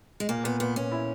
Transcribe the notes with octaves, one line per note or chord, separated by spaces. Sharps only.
G#3
A#2 A#3
A#2 B3
A#2 B3
A#2 C#4
E4